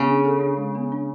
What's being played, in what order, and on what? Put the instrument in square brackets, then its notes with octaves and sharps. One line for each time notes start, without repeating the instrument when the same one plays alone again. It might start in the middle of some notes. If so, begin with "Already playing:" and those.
Already playing: [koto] C#3 [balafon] B3
[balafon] D4
A4
D4
G#3
B3
D4